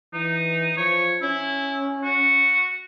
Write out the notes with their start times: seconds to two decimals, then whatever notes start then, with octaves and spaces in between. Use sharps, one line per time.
0.13 E3 D#4
0.77 F3 C#5
1.22 C#4 E4
2.03 F#4